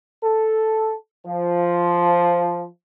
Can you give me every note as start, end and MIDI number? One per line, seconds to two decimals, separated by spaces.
0.22 0.95 69
1.25 2.67 53